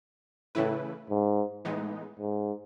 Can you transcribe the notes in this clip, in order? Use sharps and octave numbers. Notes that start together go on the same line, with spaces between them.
A2 C#3 E3 A3 E4 B4
G#2
A2 E3 G#3 B3 D#4
G#2